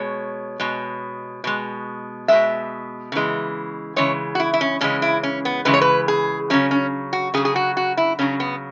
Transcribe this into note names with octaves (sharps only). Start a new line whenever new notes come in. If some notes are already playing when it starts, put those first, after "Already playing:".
Already playing: B2 G#3 C#5
B2 G#3
B2 G#3
B2 G#3 E5
C#3 E3 G#3
C#3 E3 G#3 C#5
F#4
E4
E4
C#4
C#3 E3 G#3 C#4
E4
C#4
B3
C#3 E3 G#3 B4
C#5
B4
G#4
C#3 F#3 C#4
C#4
F#4
C#3 F#3 G#4
G#4
F#4
F#4
E4
C#3 F#3 C#4
B3